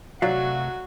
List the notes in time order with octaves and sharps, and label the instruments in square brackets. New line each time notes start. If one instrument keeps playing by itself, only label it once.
[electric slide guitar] C3 A3 E5 [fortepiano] F#3 [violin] F#4 [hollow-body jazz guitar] D5 F5